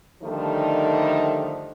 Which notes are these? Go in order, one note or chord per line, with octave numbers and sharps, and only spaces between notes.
D3 D#3 F3 G3 A3 D#4